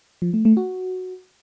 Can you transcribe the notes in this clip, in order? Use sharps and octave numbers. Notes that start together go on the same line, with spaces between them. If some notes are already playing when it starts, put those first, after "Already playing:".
F3
A3
A3
F#4